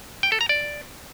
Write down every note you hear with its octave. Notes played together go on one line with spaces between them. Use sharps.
G5
A4
A#5
D5